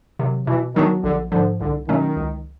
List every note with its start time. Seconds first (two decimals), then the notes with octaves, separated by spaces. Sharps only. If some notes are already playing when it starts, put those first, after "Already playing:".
0.19 C3 D#3 F#3
0.47 B2 E3
0.76 D#3 F#3 B3 D4 F#4
1.04 A#1 D3
1.32 G#2 D3 F3
1.61 C2 D3
1.88 B2 D#3 F#3 A3 C#4
2.17 C#2